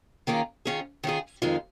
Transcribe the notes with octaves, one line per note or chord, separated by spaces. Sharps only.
D#3 A#3 C#4 F4 G#4
D#3 C#4 F4 G#4
D#3 C#4 F4 G#4
F2 D#3 G#3 F4